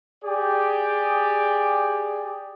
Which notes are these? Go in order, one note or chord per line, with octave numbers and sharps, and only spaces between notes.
G4 G#4 D5